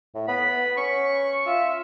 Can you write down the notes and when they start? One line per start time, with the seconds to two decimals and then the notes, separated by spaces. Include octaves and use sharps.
0.15 A2
0.28 B3 B5
0.77 C#4 C#6
1.46 F4 E5